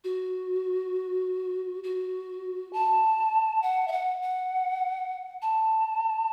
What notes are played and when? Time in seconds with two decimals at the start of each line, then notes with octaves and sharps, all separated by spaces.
0.04 F#4
1.84 F#4
2.73 A5
3.62 F#5
3.88 E5
3.92 F#5
4.22 F#5
5.42 A5